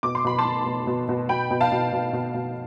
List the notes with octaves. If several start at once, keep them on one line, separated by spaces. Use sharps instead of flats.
B2 D6
C6
B2 B5
A5 C6
B2
B2
B2
B2
B2 G5 B5
B2
F5 A5
B2
B2
B2
B2